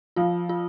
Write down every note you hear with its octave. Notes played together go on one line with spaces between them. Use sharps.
F3 F4
F4